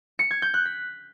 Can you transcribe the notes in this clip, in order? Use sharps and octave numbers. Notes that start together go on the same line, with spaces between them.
C#7
G#6
G6
F#6
B6